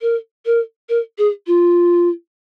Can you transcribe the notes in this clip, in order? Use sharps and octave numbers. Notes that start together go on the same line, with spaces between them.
A#4
A#4
A#4
G#4
F4